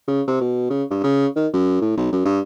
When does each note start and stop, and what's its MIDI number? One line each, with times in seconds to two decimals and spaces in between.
0.07 0.22 49
0.28 0.40 48
0.41 0.68 47
0.70 0.83 49
0.90 1.03 43
1.04 1.27 49
1.36 1.47 51
1.53 1.81 42
1.81 1.95 45
1.97 2.11 35
2.12 2.21 42
2.25 2.40 43